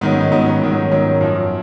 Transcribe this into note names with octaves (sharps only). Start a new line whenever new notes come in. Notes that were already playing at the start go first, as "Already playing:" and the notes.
G#2 D#3 F#3 B3
C#4
D#4
G#2 D#3 F#3 B3
C#4
G#2 D#3 F#3
G#2 D#3 F#3 C#4
F#2 F3